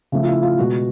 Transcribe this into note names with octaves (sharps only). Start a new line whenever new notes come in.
C#3 F3 A3
F4
E4
F4
B2 G#3 F#4